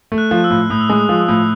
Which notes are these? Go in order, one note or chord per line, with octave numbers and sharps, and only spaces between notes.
A3
F#6
F3
E6
A2
A2 D#6
E6
G#3 D#6
F3
A2